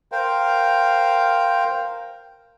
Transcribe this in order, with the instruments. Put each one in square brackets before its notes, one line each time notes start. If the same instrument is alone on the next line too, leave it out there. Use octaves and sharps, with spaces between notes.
[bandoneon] A#4 C5 F5 G5